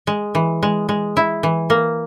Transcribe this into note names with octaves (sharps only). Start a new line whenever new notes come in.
G#3
E3
G#3
G#3
E4
E3
A#3